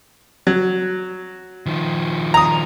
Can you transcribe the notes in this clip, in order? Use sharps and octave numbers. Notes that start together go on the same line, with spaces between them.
F#3
D#3 F3
A#5 D#6